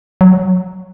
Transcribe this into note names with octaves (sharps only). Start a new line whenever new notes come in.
F#3